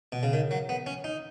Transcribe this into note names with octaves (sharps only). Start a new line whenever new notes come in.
B2
C#3
D#3
F#3
B3
C#4
D#4